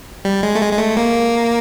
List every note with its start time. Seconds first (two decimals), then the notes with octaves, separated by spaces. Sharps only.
0.25 G3
0.43 G#3
0.55 A3
0.61 G#3
0.73 G#3
0.79 A3
0.97 A#3